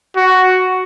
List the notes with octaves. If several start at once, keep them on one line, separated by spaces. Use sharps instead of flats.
F#4